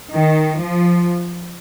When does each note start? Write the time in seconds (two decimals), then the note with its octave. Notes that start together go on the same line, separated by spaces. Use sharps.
0.14 D#3
0.59 F3